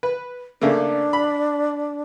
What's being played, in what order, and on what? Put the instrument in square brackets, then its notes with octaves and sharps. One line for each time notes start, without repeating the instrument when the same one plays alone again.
[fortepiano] B4
[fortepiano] C#3 A3 A#3 [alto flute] D4
[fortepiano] B5